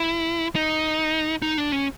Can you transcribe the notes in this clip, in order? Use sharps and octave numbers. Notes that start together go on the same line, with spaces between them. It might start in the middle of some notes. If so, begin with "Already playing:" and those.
Already playing: E4
D#4
D#4
D4
C#4